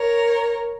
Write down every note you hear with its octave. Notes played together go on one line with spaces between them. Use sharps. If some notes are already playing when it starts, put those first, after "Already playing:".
Already playing: A#4 C#5